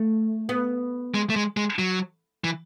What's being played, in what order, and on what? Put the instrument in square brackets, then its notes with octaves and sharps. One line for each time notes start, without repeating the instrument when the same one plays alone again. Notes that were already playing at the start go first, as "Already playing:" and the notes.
Already playing: [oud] A3
B3
[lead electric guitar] G#3
A3
G#3
G#3
F#3
E3